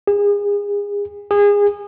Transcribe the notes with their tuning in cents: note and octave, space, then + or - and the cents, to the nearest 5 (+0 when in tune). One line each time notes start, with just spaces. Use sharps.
G#4 -30
G#4 -25